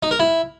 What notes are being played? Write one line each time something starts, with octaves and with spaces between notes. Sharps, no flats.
D#4
A#4
E4